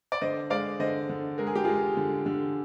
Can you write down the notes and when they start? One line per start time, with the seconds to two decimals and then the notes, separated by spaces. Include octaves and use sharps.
0.12 D5
0.21 D3 C5 D#5
0.50 G#3 D5 F5
0.80 D3 C5 D#5
1.09 D3
1.38 G#3 A#4
1.47 G#4
1.55 G4
1.64 G#3 F4 G#4
1.97 D3
2.26 D3